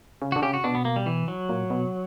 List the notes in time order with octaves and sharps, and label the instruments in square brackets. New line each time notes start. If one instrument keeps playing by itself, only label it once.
[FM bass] C#3
[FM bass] D3 [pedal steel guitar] F#4
[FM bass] C#3 [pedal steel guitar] G4
[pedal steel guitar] F#4
[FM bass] B2 [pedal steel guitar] D4
[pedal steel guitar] B3
A#3
G3
E3
F#3
[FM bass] A#2
B2